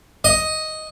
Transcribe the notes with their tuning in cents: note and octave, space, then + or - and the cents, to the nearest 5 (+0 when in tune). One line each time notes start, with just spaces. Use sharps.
D#5 +5